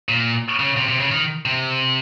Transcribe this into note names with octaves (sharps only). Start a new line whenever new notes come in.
A#2
C#3
C3
C3
C#3
D#3
C3